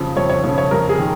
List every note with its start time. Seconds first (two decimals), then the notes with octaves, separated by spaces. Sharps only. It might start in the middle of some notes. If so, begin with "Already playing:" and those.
Already playing: F2 C#3 F3
0.16 F2 C#5
0.30 C#5
0.44 C#3 F3 C#5
0.58 C#5
0.71 F2 A#4
0.89 G#4
0.98 D#3